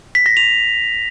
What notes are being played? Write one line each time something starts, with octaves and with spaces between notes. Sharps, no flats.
B6
A#6
F7